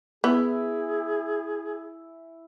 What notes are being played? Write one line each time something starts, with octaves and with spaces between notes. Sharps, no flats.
B3 E4 G#4 G#5 B5